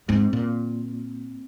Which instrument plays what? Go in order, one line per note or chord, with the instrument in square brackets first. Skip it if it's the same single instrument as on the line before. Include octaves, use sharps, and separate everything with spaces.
[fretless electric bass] G#2 [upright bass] C4
[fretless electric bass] A#2